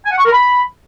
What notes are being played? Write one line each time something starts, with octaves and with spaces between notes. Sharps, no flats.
G#5
F#5
C#6
A#4
B5